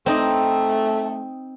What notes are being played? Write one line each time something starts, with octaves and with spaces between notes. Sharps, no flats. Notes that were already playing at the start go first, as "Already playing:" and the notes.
A3 C4 D#4 D#5